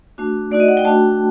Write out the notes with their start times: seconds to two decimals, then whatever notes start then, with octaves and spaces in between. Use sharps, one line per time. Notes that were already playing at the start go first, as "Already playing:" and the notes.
0.18 A3 D4 F#4
0.51 A3 D#4 F#4 D5
0.60 D#5
0.68 F#5
0.77 G5
0.85 A3 D4 F#4 A5